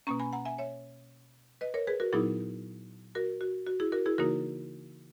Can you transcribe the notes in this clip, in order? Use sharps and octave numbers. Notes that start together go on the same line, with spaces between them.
B2 A#3 C#4 A#5 C#6
G#5 B5
F#5 A#5
E5 G#5
C#5 E5
B4 D#5
A#4 C#5
G#4 B4
F#4 A#4
A#2 F#3 B3 D#4 E4 G#4
F#4 A#4
F#4
F#4
E4 G#4
F#4 A#4
E4 G#4
C#3 E3 A#3 D#4 F#4 A#4